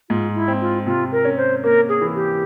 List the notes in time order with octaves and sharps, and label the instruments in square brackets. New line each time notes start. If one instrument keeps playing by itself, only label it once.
[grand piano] G#2 [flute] F4
[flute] E4
[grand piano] C4
[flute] F4
[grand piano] C3 [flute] F4
[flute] A#4
[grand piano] C#4
[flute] C5
[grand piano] A#3 [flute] A#4
[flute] G#4
[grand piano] E3
[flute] G4